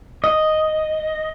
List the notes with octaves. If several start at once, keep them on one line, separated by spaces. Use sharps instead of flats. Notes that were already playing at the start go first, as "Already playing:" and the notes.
D#5